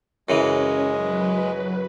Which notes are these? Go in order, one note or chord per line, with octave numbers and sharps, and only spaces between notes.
F#2 C#3 E3 G#3 C#4
F#3 B4